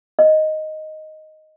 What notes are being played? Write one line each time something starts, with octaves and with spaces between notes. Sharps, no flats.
D#5